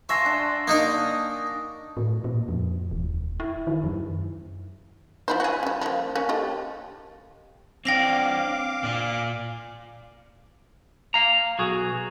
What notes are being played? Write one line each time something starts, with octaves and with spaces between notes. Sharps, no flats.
E5 F5 G#5 A5 C6 C#6 A#6 C7
D4 F#5
A#3 D#4 A#4 D#6
A2
A#2
F2
D#1
E4
D#3
F#2
F3 E4 C5
F#4 G#4
C#3 G3
F3 A#3
A#3 C#4
G4 A4 D#5
C4 D4 F5 G5 D6 A#6 F7
A#2 D5
F5 A#5
B1 F#4 G#4